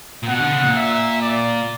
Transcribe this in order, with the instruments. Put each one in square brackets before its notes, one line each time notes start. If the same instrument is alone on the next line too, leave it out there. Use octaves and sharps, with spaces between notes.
[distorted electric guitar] A#2
[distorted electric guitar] B2 [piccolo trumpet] F#5
[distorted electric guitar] D3
C#3
A#2
[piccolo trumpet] E5
D5